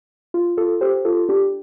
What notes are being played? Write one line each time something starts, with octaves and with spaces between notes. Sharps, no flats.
F4
F4 A4
G4 C5
F4 A4
D4 G4